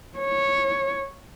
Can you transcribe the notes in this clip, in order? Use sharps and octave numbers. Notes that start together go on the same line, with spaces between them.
C#5